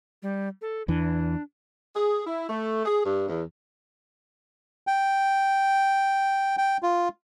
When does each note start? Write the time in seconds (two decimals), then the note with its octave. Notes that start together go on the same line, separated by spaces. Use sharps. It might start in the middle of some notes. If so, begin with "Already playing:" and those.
0.23 G3
0.62 A4
0.88 E2 E3 D4
1.94 G#4
2.26 E4
2.49 A3
2.85 G#4
3.04 G2
3.28 E2
4.87 G5
6.58 G5
6.83 F4